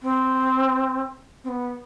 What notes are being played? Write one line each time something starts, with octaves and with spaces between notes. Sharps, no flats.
C4
C4
B3